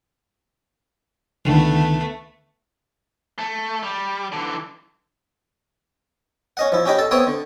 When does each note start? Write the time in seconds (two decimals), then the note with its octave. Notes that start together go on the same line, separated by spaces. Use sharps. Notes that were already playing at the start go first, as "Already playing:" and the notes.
1.45 C#2 D3 D#3 A3 B3
3.39 A3
3.83 G3
4.32 D3 E3
6.57 C#4 D#5 F#5
6.72 F3 E4
6.85 C#4 D4 G4 D#5 B5
6.98 A4 A5
7.11 B3 C4 C#5 D5 E5 D#6
7.27 D3